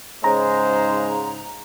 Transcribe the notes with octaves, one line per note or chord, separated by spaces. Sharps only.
G#2 C#3 G#3 C5 A#5